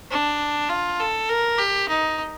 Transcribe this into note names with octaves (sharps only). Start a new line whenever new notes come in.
D4
F4
A4
A#4
G4
D#4